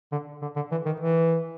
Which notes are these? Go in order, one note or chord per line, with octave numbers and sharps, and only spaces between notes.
D3
D3
D3
E3
D#3
E3